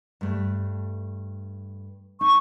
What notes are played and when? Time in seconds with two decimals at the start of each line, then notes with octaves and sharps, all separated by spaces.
0.21 G2 A3
2.21 D#4 C#6